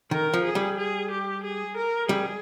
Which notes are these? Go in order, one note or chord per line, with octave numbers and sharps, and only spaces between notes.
D#3 A#4
F3
G#4
G3
G#4
G4
G#4
A#4
G3 G#4